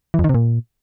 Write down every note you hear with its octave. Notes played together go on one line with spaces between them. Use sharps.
E3
F2
D#3
C3
A#2